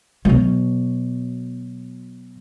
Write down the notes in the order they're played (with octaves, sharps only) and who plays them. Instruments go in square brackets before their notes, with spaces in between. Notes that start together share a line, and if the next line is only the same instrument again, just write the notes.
[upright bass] B2 F#3